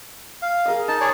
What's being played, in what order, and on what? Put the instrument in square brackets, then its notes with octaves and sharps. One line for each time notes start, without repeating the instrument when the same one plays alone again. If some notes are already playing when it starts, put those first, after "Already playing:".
[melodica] F5
[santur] G#4 A#4 D#5
[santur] D#4 [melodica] A5
[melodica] G#4 C#5 D5